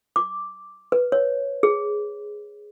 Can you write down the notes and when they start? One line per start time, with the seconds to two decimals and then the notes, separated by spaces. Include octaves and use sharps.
0.16 D6
0.92 B4
1.12 C#5
1.63 G#4